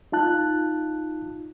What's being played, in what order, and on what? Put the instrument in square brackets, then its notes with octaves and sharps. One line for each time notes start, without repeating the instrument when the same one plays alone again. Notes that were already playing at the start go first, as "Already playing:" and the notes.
[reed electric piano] D#4 F4 A5 F#6